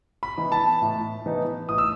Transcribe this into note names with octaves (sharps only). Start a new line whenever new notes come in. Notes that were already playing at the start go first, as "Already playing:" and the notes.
B5
E3 B3 D#4
A5
A2
E3 B3 D#4
A2 D#6
E6